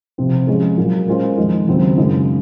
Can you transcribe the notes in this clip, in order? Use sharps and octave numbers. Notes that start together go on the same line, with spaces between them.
C3 F3 C4
F3 G#3 C#4 G#4
A#2 F#3 A#3
A#2 G#3 C#4 F4 C5
F2 D#3 G#3
D#2 C#3 F#3 C4
F#2 C#3 G#3 D#4